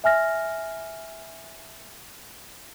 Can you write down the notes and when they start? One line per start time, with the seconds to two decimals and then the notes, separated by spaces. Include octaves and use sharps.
0.04 E5 G#5 F6 A#6